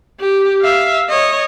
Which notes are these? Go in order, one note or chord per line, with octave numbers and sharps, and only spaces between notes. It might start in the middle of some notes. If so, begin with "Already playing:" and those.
G4
E5 F5
C#5 D#5